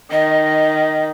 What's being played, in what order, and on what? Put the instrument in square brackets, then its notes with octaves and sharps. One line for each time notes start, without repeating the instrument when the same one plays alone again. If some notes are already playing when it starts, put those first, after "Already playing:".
[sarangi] D#3 [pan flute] D#5